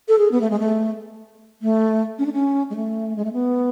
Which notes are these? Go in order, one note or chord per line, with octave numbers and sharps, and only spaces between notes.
A4
G#4
B3
A3
G#3
A3
A3
C#4
D4
C#4
G#3
A3
G#3
A3
B3